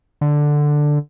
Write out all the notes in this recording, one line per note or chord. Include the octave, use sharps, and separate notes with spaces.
D3